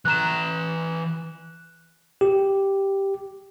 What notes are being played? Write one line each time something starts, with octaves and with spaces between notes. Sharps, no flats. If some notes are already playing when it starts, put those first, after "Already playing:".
E3 A#5 F#6 E7
G4